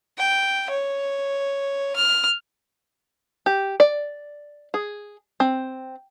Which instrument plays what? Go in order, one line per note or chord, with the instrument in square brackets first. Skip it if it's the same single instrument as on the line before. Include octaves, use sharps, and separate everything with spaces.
[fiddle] G5
C#5
F6
[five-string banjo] G4
D5
G#4
C4